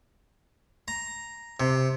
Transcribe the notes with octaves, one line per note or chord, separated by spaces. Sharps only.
A#5
C3